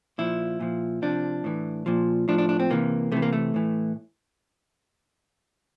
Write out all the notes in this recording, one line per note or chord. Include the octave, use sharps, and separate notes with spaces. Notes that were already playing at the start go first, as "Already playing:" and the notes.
A#2 F3 E4
A#2 F3
C3 F3 D4
A2 E3
A#2 F3
A2 F3 D4
D4
D4
C4
C3 E3 A#3
C3 E3 A3
A#3
A3
A2 E3